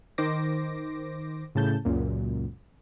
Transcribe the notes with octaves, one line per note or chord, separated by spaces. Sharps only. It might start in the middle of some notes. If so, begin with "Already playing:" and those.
D#3 C5 D6 A#6
A2 C#3 A5 G6
C#2 F#2 A#2